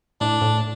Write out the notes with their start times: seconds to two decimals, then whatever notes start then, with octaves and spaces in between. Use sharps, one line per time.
0.21 A2 D4
0.41 A2